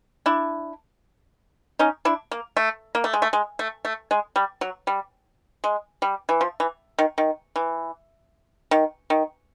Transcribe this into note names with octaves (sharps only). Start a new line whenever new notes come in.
D4 E4
C#4 D#4
D4 E4
A#3
A3
A#3
A3
G#3
A3
G#3
A3
A3
G#3
G3
F#3
G3
G#3
G3
E3
F3
E3
D#3
D#3
E3
D#3
D#3